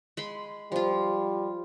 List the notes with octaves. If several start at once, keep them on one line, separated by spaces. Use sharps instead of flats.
G#3 B5 C6
F3 G3 F4